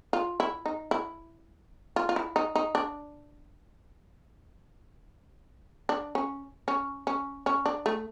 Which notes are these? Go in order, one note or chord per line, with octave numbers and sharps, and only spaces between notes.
F4
E4
D#4
E4
F4
F4
E4
D#4
D#4
D4
D4
C#4
C#4
C#4
C#4
D4
A3